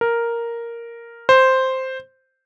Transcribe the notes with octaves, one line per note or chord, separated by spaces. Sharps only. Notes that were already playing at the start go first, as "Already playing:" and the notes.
A#4
C5